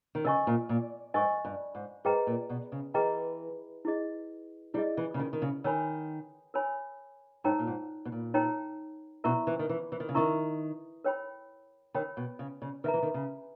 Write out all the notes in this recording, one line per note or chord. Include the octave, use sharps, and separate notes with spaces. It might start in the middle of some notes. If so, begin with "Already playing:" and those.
D#3
C#3 A#4 D#5 G#5 C#6
A#2
A#2
G#2 A#4 D#5 G#5 C#6
G2
G#2
G#2 G#4 B4 D#5 G5 A#5
A#2
B2
C#3
E3 G#4 B4 D#5 G5 A#5
E4 G#4 D#5
G3 E4 G#4 D#5
E3
C#3
D#3
D#3
C#3
D#3 A#4 C#5 G#5 B5
A#4 C#5 G#5 B5
G#2 D#4 A#4 C#5 G5 A#5
A#2
G#2
B2
A#2
D#4 A#4 C#5 G5 A#5
B2 E4 A#4 E5 A#5 C#6
E3
D#3
E3
E3
D#3
C#3
D#3 E4 A#4 E5 A#5 C#6
A#4 C#5 G5 B5
D#3 A#4 C#5 G5 B5
B2
C#3
C#3
D#3 B4 E5 A#5
E3
D#3
C#3